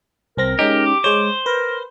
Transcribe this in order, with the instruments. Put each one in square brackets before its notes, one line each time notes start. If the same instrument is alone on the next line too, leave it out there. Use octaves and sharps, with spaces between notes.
[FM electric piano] C2 C4 A#6 [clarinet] A#4
[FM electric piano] G#3 C#4 D#4 [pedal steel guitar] G4
[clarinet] D6
[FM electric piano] G#3 C#5 [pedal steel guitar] C5
[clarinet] A#4 [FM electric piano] B4